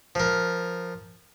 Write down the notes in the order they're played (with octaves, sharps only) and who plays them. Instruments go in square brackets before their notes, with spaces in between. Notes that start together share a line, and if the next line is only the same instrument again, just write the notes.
[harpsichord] F3 A#4